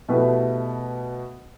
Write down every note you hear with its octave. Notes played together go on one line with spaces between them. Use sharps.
B2 A3 E4 G4 B4